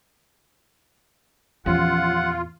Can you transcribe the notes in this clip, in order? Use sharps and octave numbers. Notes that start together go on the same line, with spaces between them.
E2 A#2 F3 C#4 F4 G4 F#5